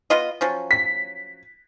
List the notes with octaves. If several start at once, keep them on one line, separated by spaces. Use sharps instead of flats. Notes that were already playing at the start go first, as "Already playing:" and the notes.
B3 F4 D#5
F3 F#3 C#4
B6